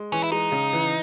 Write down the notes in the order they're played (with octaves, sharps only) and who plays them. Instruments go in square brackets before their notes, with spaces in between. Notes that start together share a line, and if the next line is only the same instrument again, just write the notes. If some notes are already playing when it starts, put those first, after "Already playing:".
Already playing: [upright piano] G#3
[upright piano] E3 [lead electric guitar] C#4
[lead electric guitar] E4
[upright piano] G#3 [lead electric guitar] D#4
[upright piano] C#3
E3